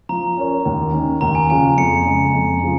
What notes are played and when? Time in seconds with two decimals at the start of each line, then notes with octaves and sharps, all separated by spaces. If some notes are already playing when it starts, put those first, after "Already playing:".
0.09 F3 A#5
0.37 C#4 A#4 C#5
0.65 D#2
0.93 D#3 C#4
1.21 D#2 A#5
1.35 G#5
1.50 C#3 F3 C#4 F4 G#5
1.78 F2 C#7
2.06 C#3 G#3
2.34 F2
2.63 C#3 F3